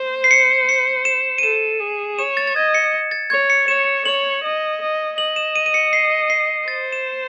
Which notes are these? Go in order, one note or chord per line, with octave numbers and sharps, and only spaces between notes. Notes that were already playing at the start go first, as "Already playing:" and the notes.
Already playing: C5
C7
C#7
C#7
E7
D#7
A4 E7
G#4
C#5 E7
A6
A6
D#5 G#6
C#7
A6
C#5 G#6
C#7
C#5 E7
C#5 F#7
D#5
D#5
D#5 F#7
E7
D#7
D#7
C#7
C7
C7
C5 A6
E7